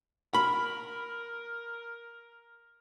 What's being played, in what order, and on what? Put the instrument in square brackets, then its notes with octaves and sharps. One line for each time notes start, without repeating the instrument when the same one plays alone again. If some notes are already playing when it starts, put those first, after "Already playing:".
[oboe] A#4 [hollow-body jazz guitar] B5